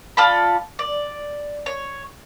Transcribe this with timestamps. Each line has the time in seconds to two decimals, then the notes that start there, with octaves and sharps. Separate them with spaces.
0.17 F4 A4 D5 B5
0.79 D5
1.66 C#5